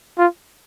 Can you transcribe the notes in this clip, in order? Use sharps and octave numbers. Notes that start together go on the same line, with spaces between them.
F4